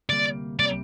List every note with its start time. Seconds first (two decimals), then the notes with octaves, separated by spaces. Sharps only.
0.10 D2 C3 G3 A#3 D5
0.59 C3 G3 A#3 D5